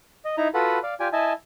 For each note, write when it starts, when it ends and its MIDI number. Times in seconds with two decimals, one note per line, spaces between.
0.25 0.36 75
0.37 0.48 63
0.37 0.48 64
0.37 0.48 82
0.54 0.79 65
0.54 0.79 66
0.54 0.79 69
0.54 0.79 71
0.54 0.79 78
0.54 0.79 83
0.83 0.94 74
0.83 0.94 77
1.00 1.08 65
1.00 1.08 67
1.00 1.08 74
1.00 1.08 79
1.00 1.08 80
1.13 1.33 64
1.13 1.33 75
1.13 1.33 76
1.13 1.33 80
1.13 1.33 81